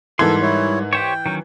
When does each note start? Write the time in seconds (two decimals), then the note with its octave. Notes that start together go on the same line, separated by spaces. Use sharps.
0.19 G#2 E3 G3 A4 A#4 C6 G#6
0.42 E4 C#5
0.93 G4 C5 C#5 G5
1.26 D#3 F#3 C#4